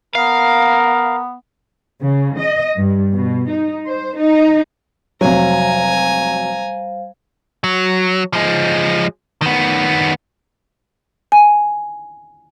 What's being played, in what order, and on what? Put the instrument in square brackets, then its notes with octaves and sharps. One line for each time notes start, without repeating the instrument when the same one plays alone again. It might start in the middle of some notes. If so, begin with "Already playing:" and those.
[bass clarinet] B3 [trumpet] A#4 [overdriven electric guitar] F5
[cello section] C#3
D#5
G2
B2
D#4
C5
D#4
[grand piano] F1 F#3 [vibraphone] G3 C5 F5 [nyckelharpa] G#5 A#5
[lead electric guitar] F#3
F3 G#3
D#3 B3
[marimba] G#5